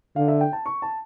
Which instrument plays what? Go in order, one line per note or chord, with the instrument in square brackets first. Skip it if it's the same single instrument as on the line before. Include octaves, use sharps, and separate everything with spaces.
[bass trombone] D3 [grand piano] F5
[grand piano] E5
G5
A5
C#6
A5